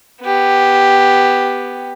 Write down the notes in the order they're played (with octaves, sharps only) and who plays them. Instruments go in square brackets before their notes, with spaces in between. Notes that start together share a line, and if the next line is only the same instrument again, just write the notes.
[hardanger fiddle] B3 G4